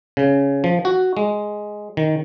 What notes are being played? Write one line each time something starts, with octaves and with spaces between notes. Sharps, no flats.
C#3
F3
F#4
G#3
D#3